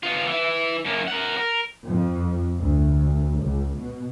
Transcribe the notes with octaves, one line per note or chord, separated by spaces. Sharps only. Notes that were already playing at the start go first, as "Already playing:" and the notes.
B3 F4
E3 E4
F#2 A#3
A#4 F#5
A#4
F2
D2
C#2
B2